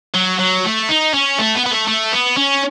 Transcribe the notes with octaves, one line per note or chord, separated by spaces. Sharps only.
F#3
F#3
A3
D#4
C#4
A3
B3
B3
A3
A3
B3
C#4